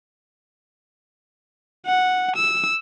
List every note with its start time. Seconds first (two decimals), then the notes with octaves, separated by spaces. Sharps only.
1.86 F#5
2.36 E6